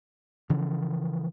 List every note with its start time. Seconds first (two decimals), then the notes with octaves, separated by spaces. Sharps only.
0.50 C#3 E3 F3